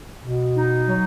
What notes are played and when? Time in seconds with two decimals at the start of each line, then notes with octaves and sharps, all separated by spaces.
0.22 B2
0.54 D#4
0.87 F#3